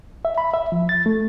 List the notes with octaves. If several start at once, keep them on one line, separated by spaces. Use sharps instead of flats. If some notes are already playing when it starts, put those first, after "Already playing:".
E5
B5
E5
F3
A6
A3